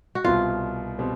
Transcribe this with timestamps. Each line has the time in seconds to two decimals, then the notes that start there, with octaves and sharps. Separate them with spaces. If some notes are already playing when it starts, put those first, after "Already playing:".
0.15 F#4
0.24 C2 B2 G3 C4 F4
0.99 B2 G3 C4